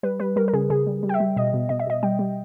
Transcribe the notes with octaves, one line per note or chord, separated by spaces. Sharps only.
G3 B4
G3 B4
G3 A#4
A#4
C#3 G#4
C#3 G#4
G3
G3
G5
E5
G3
B2 D#5
B2
B2 D#5
E5
B2 D#5
G3 G5
G3